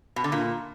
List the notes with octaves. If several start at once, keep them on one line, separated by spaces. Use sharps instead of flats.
B2
D3
A#2